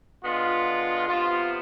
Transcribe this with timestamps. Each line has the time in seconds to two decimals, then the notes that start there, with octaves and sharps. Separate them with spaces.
0.24 D3 G#3 B3 F4
1.07 C3 F3 B3 F4